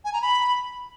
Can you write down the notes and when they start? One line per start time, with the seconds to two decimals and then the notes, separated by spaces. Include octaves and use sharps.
0.05 G#5
0.13 A#5
0.22 B5